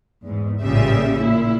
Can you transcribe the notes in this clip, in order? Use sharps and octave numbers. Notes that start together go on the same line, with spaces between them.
E2 G#2
A1 A#2 C#3 G3 E5
A#2 E4